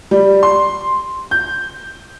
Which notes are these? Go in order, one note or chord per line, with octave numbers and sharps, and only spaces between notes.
G3
C6
G6